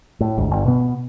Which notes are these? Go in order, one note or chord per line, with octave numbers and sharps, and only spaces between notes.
A2
A1 D2 G#2
G1
B2 B3